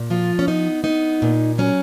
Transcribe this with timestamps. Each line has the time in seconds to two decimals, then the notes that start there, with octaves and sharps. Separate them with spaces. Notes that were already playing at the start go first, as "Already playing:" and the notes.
Already playing: A#2
0.10 F3 F4
0.39 C#4
0.48 B3 D#4
0.84 B3 D#4
1.22 A#2
1.58 F#3 C#4